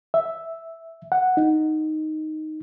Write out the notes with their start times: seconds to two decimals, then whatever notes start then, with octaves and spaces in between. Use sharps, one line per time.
0.14 E5
1.12 F#5
1.37 D#4